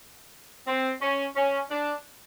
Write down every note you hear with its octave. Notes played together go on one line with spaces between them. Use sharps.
C4
C#4
C#4
D4